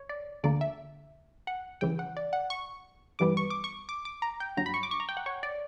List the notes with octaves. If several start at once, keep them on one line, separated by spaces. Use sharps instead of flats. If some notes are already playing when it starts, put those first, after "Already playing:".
Already playing: C#5
D5
D2 D3 A#3 D5
E5
F#5
C#2 C#3 E3 G5
F#5
D5
F#5
C#6
G2 E3 G3 B3 D6
C#6
D6
C#6
D6
D6
A#5
G5
G1 G2 F#3 A#5
B5
C#6
D6
C#6
A#5
G5
F#5
C#5
D5